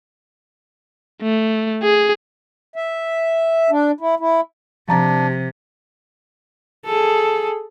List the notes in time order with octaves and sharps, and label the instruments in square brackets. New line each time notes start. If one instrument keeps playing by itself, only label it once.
[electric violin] A3
G#4
[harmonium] E5
D4
E4
E4
[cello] C3 [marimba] F3 A#5 A6 [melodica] D4
[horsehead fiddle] G#4 A4